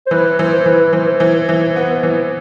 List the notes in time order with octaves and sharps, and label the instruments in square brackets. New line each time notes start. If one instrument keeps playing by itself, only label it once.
[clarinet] C5
[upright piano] E3 [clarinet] B4
[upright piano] E3 [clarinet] C5
[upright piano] E3 [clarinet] B4
[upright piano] E3 [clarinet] C5
[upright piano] E3 [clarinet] C5
[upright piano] E3
B3
E3